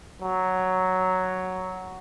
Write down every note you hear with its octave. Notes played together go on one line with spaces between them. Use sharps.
F#3